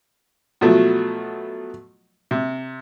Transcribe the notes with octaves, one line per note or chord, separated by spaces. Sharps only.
B2 F3 F#3 A3
C3